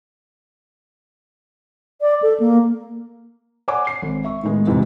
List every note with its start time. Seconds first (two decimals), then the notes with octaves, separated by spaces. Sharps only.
2.01 D5
2.22 A4
2.40 A#3
3.68 C#5 D5 F#5 G#5 D6
3.87 C7
4.02 G#1
4.24 E5 C#6
4.43 A2 D#3 G#3 B3
4.67 E1 F2 G#2 C3 E3